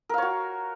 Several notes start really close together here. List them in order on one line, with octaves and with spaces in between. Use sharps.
A#4 F5 C#5 F#4